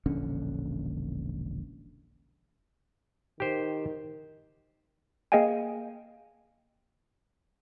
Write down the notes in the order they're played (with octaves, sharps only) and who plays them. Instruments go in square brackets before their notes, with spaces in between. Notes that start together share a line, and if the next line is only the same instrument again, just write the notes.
[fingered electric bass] E1 A#1 D3 C#4
[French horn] D#3 [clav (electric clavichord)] G4 C5
[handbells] A#3 G#4 D#5 F5 G5 G#5